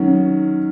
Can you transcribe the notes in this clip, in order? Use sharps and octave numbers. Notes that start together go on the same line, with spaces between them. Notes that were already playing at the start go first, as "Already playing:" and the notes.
Already playing: D#3 F#3 C#4